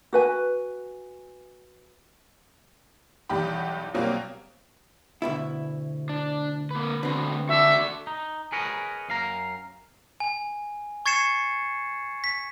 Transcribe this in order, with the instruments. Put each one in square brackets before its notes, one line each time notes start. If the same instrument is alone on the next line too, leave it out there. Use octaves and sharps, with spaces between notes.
[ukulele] F#4 B4 G#5
[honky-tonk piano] B1 E2 G3 D#4 G4 B5
B2 F#3 G3 A#3 C4
[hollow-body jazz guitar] D2 B2 E4
[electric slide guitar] D4
A#3 B4
[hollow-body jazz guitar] D3 C4 [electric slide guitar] A3 F#4 B4
[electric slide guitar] F#4 A4 D5 [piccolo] E5
[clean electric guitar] D#4
G#4 A#4 B4 C#5 D#5
F#2 F5 A#5
[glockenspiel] G#5
C#6 G#6 A6 C7 C#7 E7
B6